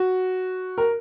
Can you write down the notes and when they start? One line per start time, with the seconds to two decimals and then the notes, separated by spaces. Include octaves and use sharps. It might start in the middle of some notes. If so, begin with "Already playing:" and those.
Already playing: F#4
0.78 A#4